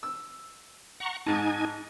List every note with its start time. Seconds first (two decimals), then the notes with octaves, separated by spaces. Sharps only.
0.03 E6
1.00 F#5 A#5 C#6
1.26 G#2 D#4 G#5 A5